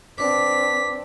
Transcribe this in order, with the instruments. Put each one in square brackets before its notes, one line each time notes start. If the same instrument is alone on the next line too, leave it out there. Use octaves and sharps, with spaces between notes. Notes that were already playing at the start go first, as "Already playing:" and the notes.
[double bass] C4 D4 [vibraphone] B4 D6 [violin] B6